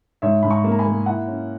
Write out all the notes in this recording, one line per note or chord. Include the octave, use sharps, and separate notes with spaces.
G#2 C#5 E5
G#2 B5
A#5 C#6
A#3
A#5
G#5 B5
A#3
E4 F#5 A#5
C#4